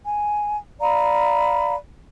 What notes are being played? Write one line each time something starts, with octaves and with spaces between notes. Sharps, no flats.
G#5
D5 F5 A#5 B5